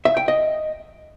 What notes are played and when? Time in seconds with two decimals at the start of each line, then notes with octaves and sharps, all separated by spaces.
0.05 E5
0.17 G5
0.28 D#5